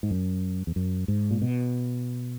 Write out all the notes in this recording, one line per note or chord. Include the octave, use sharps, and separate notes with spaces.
G#2
F#2
E2
F#2
G#2
A#2
B2